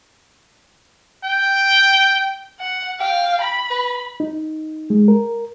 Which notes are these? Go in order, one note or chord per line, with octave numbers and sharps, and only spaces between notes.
G5
F#5
F5 G5
B5
B4
D#4
G#3
A#4